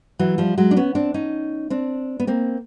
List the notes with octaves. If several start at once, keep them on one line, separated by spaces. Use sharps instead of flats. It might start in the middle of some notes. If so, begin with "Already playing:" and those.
E3 F#3
F3 G3
F#3 G#3
D4
B3 C#4
C4 D4
C#4 D#4
C4 D4
B3
A#3 C4